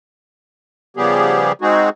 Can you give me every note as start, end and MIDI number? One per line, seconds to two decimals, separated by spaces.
0.97 1.52 49
0.97 1.52 53
0.97 1.52 55
0.97 1.52 59
0.97 1.52 67
0.97 1.52 68
1.61 1.89 56
1.61 1.89 60
1.61 1.89 63
1.61 1.89 66
1.61 1.89 68